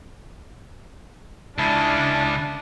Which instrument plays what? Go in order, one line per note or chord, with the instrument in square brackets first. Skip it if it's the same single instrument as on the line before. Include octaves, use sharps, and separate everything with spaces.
[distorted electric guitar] C#2 C#3 [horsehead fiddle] D4 D5 [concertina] E4 A5